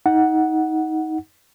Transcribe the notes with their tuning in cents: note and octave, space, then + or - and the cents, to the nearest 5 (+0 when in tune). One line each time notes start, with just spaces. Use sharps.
D#4 +25 F#5 +0